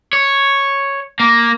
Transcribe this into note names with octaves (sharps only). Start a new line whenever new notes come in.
C#5
A#3